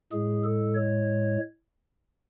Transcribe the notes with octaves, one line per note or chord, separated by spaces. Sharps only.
A2 G#3 G#4
A4
C#5